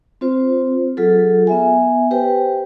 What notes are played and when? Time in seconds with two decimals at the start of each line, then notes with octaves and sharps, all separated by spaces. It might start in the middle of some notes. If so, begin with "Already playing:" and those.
0.21 C4 F4 C5
0.97 F#3 F4 G#4 A4
1.47 B3 E5 G#5
2.11 G4 B4 C5 G5